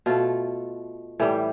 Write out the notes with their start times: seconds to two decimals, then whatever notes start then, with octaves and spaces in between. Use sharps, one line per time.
0.06 B2 A3 F4
1.20 A2 E3 G3